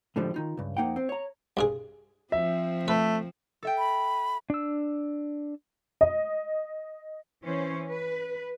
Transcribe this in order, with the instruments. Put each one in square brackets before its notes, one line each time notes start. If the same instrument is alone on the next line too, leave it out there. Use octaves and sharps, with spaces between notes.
[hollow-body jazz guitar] A2 D3 F3 G3 G#3
D#3 D#4 F4
C#2 G2
F2 A#3 D#4 F#5 G5
C4
C#5 A#5
[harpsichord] C2 G2 G#4
[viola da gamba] F3 C4 [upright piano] E5
[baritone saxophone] A3 [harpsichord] B4
[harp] A4 E5 G5
[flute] B5
[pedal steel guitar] D4 E6
[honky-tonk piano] D#5
[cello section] E3 C#4 C5
B4